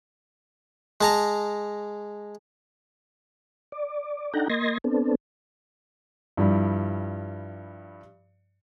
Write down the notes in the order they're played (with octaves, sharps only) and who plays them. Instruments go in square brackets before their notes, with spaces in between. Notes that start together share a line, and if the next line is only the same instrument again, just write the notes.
[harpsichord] G#3 A5 A#5
[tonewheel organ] D5
D4 D#4 A4 F#5 G5 A#5
A#3 D#5 C6 G#6 A#6
B3 C4 D4 A4
[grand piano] G2 F3 G3 E4